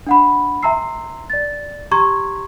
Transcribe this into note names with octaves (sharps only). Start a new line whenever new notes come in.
D4 F#5 B5
E5 G#5 A#5 C6 E6 C7
D5 A6
G4 A#5 C6 C#6 G#6